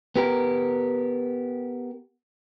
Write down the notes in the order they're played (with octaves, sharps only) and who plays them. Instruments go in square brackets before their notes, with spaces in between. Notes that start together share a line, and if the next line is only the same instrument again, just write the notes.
[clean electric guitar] B3 G4 A#4